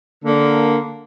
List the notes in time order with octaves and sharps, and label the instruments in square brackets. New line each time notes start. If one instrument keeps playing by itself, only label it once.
[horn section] D3 A#3